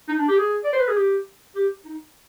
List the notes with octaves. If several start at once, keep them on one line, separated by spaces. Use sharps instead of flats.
D#4
D4
G4
G#4
D5
C5
B4
G#4
G4
G4
D#4